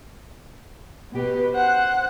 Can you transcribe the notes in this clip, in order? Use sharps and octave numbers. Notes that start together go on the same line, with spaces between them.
B2 G4 B4
C5 F#5 F#6